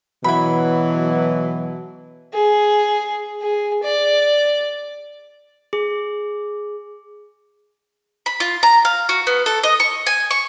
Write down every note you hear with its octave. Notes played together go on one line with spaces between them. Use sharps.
B2 E3 F#3 E4 B5
G#4
G#4
D5
G#4
B5
F4
A#5
F5
F#4
B3
A4
D#5
C#6
G#5
C#6